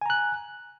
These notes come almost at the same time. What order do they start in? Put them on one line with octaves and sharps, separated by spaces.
G#5 A#5 F#6